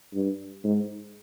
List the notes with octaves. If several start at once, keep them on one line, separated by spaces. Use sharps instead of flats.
G2
G#2